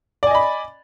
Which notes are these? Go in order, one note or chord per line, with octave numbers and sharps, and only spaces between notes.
D5 D#5 G#5 B5